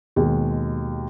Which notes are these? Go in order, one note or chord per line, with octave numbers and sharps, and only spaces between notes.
D#2 B2 G#3